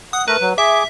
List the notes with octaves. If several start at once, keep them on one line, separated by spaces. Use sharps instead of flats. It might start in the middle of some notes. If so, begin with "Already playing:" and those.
F#5 D#6
A3 A#4 B4 A#5
F#3
G#4 E5 D6